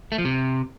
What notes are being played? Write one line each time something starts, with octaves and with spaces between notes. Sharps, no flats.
A3
F3
C3